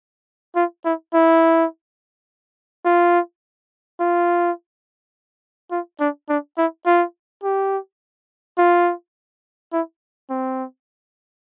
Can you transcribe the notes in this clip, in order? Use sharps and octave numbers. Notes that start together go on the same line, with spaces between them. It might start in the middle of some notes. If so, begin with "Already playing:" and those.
F4
E4
E4
F4
F4
F4
D4
D4
E4
F4
G4
F4
E4
C4